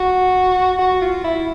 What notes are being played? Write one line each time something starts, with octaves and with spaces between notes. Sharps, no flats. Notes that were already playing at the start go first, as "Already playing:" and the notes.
Already playing: F#4
F#4
F4
E4